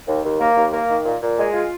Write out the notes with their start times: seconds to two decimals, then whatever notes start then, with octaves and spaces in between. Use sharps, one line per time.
0.08 D#2
0.24 D#2
0.41 A#3
0.56 D#2
0.72 A#3
0.89 D#3
1.05 A#2
1.21 A#2
1.38 G#3
1.54 F4